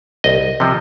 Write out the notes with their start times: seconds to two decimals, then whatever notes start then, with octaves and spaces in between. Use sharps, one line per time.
0.24 C2 D#5
0.60 C3 F3